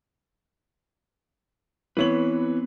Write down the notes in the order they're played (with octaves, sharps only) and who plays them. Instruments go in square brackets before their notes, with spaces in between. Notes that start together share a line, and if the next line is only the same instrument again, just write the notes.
[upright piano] E3 C#5 F#7 [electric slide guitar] B3 C4 B4